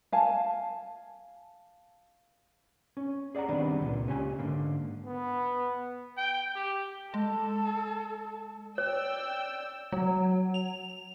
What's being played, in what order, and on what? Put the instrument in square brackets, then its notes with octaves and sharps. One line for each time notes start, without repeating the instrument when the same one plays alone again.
[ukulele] F5 G#5 A5
[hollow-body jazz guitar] C#4
G#4 D5 F5 F#5 A#5
D#3 G3 B3 C4 D4
C#2 A#2
C#2 C#4 G4 G#5
G#2 D3 A#3
[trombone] B3
[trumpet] G5
G4
[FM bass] G#3 [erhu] A4
[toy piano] C#5 [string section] D5 G5 E6
[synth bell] F#3
F7